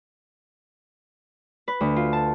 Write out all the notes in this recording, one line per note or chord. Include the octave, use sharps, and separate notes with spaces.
B4
D2
F4
A5